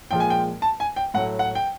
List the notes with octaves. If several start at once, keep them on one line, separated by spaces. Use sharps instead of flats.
A#2 F3 G#3 G5
G#5
G5
A5
G#5
G5
A2 F#3 A3 F#5
F#5
G5